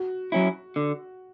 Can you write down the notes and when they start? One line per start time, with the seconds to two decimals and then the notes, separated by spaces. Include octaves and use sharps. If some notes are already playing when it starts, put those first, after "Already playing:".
Already playing: F#4
0.32 F#3 C#4 E4
0.76 D3